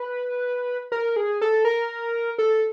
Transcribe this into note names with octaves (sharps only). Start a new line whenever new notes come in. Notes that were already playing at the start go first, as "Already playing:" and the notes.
Already playing: B4
A#4
G#4
A4
A#4
A4